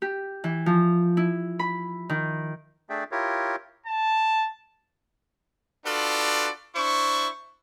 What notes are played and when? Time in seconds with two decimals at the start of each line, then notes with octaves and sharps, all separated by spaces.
0.02 G4
0.44 E3
0.66 F3
1.17 E4
1.59 B5
2.09 D#3
2.89 A3 D4 G#4 D5 E5 G5
3.11 E4 F4 G4 A#4 C#5
3.86 A5
5.85 D4 F4 F#4 A4 B4 D5
6.75 D4 E4 C5 C#6